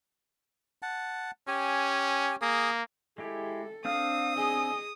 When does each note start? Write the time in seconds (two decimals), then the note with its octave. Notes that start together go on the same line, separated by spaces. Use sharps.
0.82 F#5 A5
1.47 C#4 G4 G#5
2.42 A#3 G#4 D#6
3.18 G#3 E4 G4 A4
3.85 C4 D4 F5 D#6 F6
4.37 G#4 D#5 G#5